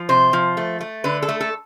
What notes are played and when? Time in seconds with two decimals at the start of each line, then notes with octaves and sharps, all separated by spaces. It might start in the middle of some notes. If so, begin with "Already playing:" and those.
Already playing: F3
0.09 C3 C5
0.33 F3
0.57 A3
0.81 A3
1.04 D3 B4
1.22 A4
1.29 A3
1.41 A4